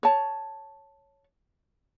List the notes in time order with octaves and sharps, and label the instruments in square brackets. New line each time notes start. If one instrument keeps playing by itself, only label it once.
[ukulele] C#5 A5